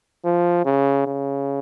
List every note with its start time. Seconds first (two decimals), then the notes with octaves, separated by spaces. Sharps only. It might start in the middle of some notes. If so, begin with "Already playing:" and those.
0.24 F3
0.65 C#3
1.07 C#3